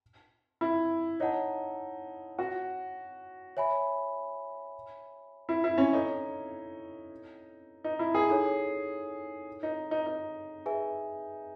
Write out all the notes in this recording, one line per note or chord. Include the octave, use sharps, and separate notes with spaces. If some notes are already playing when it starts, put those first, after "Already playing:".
E4
D#4 C#5 F#5 A5
F#4
C#5 E5 G#5 B5
E4
E4
C#4
D#4 E4 A4 C#5
D#4
E4
G#4
D#4 A4 C#5
D#4
D#4
D#4
G#4 B4 E5 G#5